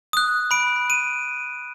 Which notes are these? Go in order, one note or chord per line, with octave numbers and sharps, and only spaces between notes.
D#6 F#6
B5 D7
D#7